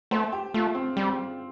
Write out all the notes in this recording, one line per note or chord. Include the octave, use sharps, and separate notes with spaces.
A3 C5
G4
A3 F4
C4
G3 C4